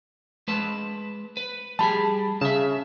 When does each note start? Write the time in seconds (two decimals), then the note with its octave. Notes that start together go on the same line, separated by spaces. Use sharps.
0.48 G#3 B4 A5
1.37 B4
1.79 G3 G4 G#4 A5 B5
2.41 C#3 E5 A5